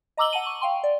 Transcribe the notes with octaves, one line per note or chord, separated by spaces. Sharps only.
D#5 A#5 D6 E6 F#7 G7
F#5 A5 D#7
C#6
F5 G5 C6
D5